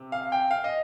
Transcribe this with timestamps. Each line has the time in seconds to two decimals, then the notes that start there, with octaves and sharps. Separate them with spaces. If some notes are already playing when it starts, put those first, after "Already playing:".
Already playing: C3
0.12 F5
0.32 G5
0.51 F5
0.64 D#5